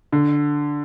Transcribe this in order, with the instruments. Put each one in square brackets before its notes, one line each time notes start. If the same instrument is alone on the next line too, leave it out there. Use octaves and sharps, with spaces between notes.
[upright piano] D3